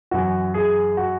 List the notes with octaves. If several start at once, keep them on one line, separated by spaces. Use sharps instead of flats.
F#2 E3 F#4
G#4
F#4